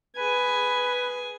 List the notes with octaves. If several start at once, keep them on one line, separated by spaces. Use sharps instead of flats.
G#4 B4 G#5